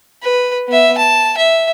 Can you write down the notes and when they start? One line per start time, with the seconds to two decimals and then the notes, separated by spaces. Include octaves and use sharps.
0.22 B4
0.68 B3 E5
0.97 A5
1.37 E5